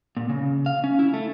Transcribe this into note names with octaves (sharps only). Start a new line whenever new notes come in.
A#2
C#3
F5
C#4
E4
A3